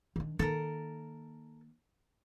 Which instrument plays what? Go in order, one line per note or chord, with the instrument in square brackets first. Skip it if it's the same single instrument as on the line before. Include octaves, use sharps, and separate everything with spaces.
[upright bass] D#3 D4
[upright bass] D#3 A#3 [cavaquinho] A4 A#4